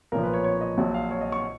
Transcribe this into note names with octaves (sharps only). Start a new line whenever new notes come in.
B1 A#2 F3 A#4
B4
C#5
C#5
D#5
A#1 A#2 F#3
F5
C#5
D#5
C#6